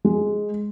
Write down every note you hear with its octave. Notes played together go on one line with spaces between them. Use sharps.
G#3